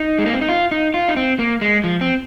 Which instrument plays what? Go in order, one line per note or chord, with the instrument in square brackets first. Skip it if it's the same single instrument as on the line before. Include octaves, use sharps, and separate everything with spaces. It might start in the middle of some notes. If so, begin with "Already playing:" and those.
Already playing: [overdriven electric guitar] D#4
G#3
A#3
C4
D#4
F4
D#4
F4
D#4
C4
A#3
G#3
F3
C4